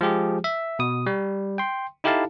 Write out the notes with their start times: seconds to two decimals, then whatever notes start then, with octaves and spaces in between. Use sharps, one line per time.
0.01 F3 G#3 G4 G#4
0.44 E5
0.79 B2 D#6
1.06 G3
1.58 G5 C6
2.04 D#4 E4 G4 A4 F5 A5